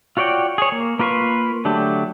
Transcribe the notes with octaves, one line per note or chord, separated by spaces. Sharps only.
F4 F#4 C#5 D5 G5
G#4 C#5
A#3
A#3 F4 B4 F5 C#6
D3 F#3 A3 D4 G4